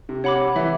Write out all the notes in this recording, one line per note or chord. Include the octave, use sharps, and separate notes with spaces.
C3
C3 C#5 F#5 B5 D6
E3 E5